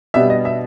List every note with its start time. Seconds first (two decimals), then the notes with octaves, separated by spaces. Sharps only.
0.14 B2 G3 B3 D4 E5
0.30 D#5
0.45 E5